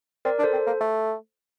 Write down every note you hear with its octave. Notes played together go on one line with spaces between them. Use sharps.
C4 A#4 D5
D4
A4 C5
C4
A#3
A3